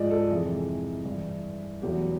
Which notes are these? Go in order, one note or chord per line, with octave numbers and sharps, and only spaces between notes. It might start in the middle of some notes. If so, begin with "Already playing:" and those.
Already playing: G#2 F3 G#3 D5 D#5
A4
A4
F2 C3 E3 G#3 G#4
G2 E3 G3
E2 B2 F#3 A3 G4